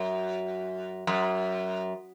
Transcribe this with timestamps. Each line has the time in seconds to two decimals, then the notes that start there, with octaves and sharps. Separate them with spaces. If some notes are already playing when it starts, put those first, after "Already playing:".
Already playing: F#2
1.07 F#2